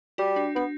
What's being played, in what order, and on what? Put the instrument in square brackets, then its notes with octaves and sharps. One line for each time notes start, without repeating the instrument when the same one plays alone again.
[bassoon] G3 [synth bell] F#4
[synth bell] D4
[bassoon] B3 [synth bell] D4